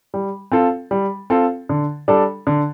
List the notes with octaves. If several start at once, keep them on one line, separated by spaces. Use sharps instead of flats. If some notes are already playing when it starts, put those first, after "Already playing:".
G3
C4 F4 A4
G3
C4 F4 A4
D3
G3 D4 A4
D3